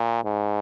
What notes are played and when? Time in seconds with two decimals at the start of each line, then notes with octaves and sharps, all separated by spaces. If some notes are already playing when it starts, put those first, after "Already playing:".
Already playing: A#2
0.24 G#2